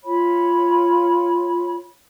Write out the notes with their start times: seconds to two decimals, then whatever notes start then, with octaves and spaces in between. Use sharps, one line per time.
0.03 F4 C#5 B5